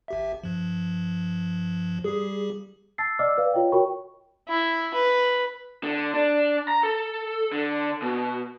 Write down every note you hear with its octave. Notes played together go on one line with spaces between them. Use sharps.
G#1 G4 E5
G2 F3
G3 G4 G#4
A5 E6 A6 C7
D5 D#5 F#5 D6 E6 F6
B4 D5 F5
F4 C#5 D#5 G5
F#4 A#4 C#5 G5 B5 C#6
E4
B4
D3
D4
A#5
A4
D3
B2